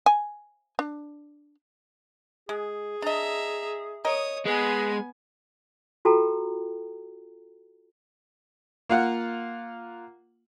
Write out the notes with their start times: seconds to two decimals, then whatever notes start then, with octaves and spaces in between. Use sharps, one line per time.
0.06 G#5
0.79 D4
2.49 G#3 G#4
3.02 D4 D#5 E5 A#5
4.05 A#4 C#5 D#5 D#6
4.46 G#3 B3 B4 G#5
6.05 F4 F#4 A4 G5 A#5
8.89 A#3 F4 F#5